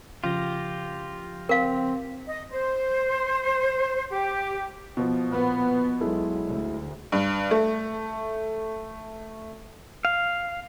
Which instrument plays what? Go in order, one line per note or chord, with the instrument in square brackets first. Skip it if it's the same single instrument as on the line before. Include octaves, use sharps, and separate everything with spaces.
[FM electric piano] C#3 F3 A#6 [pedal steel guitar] F4 G4
[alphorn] C4 [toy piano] A#4 F5
[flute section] D#5
C5
G4
[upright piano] B2 F3
[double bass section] A#2 B3
[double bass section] B1 [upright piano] G#3 E4 A4
[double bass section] D2
[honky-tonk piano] G2
A3
[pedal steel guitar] F5